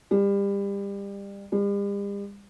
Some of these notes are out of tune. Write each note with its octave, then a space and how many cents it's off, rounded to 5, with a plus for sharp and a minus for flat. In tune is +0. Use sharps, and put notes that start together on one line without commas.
G3 +30
G3 +45